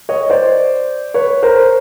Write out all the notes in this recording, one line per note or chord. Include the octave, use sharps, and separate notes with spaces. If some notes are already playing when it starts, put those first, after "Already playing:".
C#5 D#5
C5 D5
B4 C#5
A#4 C5